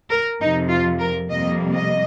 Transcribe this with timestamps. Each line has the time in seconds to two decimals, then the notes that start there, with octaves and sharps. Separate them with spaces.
0.10 A#4
0.40 F2 C3 F3 D#4
0.69 F4
0.99 A#4
1.29 F2 C3 G3 A#3 D#5
1.73 D#5